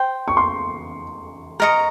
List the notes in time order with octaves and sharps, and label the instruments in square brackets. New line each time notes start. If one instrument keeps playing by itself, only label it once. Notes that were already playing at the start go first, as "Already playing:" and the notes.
Already playing: [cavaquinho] C5 G5
[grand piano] C#6
C6
[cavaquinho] A#4 D#5 A#5 C#6